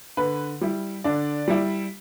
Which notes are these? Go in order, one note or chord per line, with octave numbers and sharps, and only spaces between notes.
D3 B4
G3 E4
D3 D4 D5
G3 E4